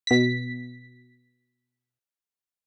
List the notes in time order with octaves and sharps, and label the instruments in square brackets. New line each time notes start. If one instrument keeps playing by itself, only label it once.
[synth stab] B2 B6